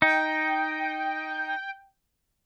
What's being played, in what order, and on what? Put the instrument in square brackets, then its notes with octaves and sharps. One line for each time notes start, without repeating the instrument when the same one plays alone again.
[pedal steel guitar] D#4 [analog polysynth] G5